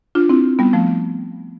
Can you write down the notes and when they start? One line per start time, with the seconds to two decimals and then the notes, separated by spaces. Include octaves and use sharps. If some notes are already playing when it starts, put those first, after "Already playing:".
0.15 D4 F4
0.29 C4 E4
0.59 G3 B3
0.73 F3 A3